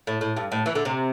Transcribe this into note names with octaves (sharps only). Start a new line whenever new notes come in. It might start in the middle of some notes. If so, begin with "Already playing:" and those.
A2
A2
G2
A2
E3
D3
C3